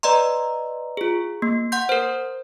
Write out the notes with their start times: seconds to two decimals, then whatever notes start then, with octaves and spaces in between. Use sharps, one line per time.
0.03 B4 D5 D#5 A#5 C6
0.97 F4 G#4
1.42 A#3
1.72 F#5 C6 G6
1.89 A#4 C5